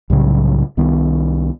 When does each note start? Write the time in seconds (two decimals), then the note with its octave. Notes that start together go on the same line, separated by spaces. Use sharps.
0.10 C2 A2 C#3 F#3
0.77 C2 D#3 B3